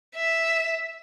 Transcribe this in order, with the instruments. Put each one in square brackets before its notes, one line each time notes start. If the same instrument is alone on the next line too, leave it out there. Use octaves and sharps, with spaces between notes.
[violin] E5